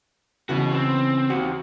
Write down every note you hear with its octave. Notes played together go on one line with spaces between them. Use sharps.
C#3 E3 B3 F#4 B4
C4
D#2 F#4